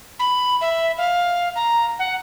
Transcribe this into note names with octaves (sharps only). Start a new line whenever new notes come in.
B5
E5
F5
A#5
F#5